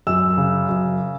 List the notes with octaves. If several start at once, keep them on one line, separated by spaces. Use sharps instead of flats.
F#2 E6
C#3
F#2